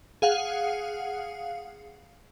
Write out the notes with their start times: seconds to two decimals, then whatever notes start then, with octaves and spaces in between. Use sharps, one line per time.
0.22 G#4 F5 F#5